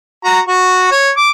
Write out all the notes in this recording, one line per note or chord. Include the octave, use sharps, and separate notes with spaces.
F#4 A#5
F#4 C#6
C#5
D6